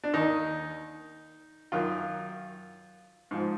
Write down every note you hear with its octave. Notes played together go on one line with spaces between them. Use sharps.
D4
D#2 D#3 D#4
F#2 D#3 F4
G#2 F3